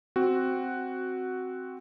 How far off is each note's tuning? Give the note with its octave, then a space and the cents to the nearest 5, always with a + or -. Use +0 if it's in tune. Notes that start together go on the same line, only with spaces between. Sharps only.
C4 +0 F#4 +0